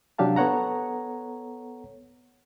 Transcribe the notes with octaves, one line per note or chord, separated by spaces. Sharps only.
C3 F#3 D4 G4 F5 A5
B3 A4 C#5 F#5 A#5